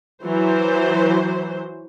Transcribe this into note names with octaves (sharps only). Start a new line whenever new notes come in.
E3 F#3 C5